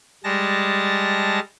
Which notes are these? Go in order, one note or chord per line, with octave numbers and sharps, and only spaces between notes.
G3 G#3 A5 A#6